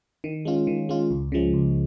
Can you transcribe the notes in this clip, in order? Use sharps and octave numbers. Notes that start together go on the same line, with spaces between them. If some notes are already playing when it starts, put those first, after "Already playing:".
D#3
G#3 C#4 F4
D#3
G#3 C#4 F4
C#2
C#3 F3 G#3
C#2